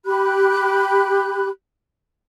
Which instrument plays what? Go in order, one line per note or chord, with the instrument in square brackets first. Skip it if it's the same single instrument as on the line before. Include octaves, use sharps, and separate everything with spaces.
[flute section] G4 B5 F#6